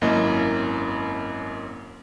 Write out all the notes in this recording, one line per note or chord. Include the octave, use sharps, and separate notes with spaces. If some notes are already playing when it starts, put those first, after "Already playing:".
G#1 F#2 A#3 C#4 E4 D#5